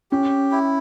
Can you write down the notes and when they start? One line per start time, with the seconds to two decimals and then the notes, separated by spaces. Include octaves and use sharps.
0.12 C#4 G4
0.52 E4